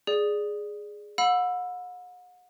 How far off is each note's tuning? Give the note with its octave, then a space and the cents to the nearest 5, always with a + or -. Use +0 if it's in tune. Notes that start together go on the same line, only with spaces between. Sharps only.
G#4 +0 D5 +5
F#5 -40 B5 +0 E6 +10